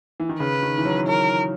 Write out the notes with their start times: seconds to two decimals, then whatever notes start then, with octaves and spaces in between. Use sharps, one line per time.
0.20 E3
0.29 D#3
0.40 C#3 B4
0.63 D#3
0.78 E3
0.85 F#3
1.07 F#3 A#4